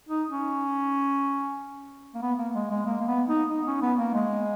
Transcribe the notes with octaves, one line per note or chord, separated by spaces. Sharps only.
D#4
C#4
A#3
B3
A#3
G#3
G#3
A#3
A#3
B3
D#4
D#4
C#4
B3
A#3
G#3